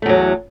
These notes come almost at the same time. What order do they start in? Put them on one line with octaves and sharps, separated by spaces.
A3 E2 F#3